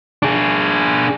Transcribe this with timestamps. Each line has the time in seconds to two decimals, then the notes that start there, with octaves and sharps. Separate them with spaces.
0.22 D4 G#4